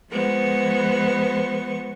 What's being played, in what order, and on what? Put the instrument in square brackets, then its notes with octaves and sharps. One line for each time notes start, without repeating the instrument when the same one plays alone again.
[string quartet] F3 G#3 B3 C5 C#6